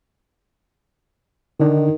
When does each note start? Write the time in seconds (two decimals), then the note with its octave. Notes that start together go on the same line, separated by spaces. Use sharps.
1.60 D3 D#3 D4 D#4